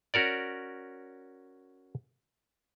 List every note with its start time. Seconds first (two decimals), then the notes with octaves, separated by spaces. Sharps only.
0.14 C#4 F#4 A#4 D5